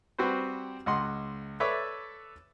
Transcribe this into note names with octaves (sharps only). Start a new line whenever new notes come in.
G3 C4 F#4 B4 C5
C#2 D#5 F#5 C6
A4 B4 C#5 D5 E5